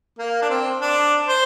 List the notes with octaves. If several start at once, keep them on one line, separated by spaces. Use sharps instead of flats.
A#3
D4
C4
D4
C5